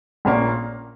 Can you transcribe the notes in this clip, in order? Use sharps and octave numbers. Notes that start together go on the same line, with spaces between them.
A#1 A#2 A#3 C#4